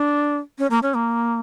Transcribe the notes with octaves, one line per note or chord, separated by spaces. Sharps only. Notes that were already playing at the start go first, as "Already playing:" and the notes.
Already playing: D4
C#4
A#3
C#4
A#3